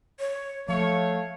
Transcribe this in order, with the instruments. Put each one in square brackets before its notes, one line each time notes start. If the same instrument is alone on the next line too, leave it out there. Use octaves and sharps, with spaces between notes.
[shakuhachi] C#5
[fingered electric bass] F3 [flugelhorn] A3 [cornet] C#5 [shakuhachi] F5